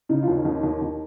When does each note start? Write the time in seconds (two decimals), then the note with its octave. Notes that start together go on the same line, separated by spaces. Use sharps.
0.09 C#3 D#4
0.23 F4
0.28 D#2
0.35 D#4
0.45 D#2
0.63 D#2
0.81 D#2